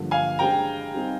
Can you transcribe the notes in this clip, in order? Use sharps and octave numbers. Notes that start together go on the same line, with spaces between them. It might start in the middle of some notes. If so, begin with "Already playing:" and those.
Already playing: G2 D3 F3 A#3 D4
F5 G#5
G#3 D4 G4 C5 G5 A#5
G3 C4 D#4